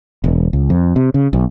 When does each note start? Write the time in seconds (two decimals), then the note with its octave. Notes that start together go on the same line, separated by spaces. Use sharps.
0.24 E1
0.53 C#2
0.70 F2
0.96 C3
1.14 C#3
1.33 B1